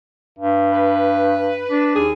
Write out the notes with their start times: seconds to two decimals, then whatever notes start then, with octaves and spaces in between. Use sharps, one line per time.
0.39 G2
0.72 B4
1.71 D4
1.95 D#2 G#4